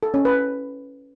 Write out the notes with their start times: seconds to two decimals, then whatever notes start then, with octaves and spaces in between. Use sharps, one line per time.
0.03 A4
0.14 C#4
0.25 B4